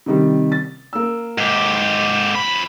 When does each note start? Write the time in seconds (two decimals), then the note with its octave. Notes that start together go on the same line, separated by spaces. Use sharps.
0.06 C3 D#3 G3
0.52 A6
0.93 A#3 E6
1.38 G#2 G4
2.36 F2 B5